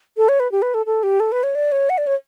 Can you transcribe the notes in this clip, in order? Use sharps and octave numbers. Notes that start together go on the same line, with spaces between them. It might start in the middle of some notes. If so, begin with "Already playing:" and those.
A4
C#5
B4
G4
B4
A4
A4
G4
A4
B4
C#5
D5
C#5
F#5
D5
C#5